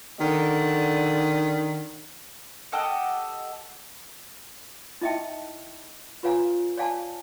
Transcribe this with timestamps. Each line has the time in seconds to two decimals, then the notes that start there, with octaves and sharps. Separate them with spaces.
0.20 D3 D#3
2.72 G4 A4 D#5 F#5
5.01 D#4 E4 D#5 E5 G5 A5
6.23 F4 B4 C#5 F5 G#5 A#5
6.77 C#5 D5 F5 G#5 A5